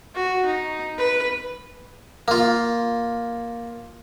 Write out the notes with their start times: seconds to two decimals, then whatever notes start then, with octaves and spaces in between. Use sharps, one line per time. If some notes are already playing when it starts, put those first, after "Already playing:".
0.15 F#4
0.45 D#4
0.98 B4
2.28 A#3 F4